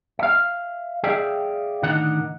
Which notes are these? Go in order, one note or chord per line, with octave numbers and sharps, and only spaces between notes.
E5 F5
G#4 D5 E5 F5 G5
A2 D3 D#3 D#4 F#5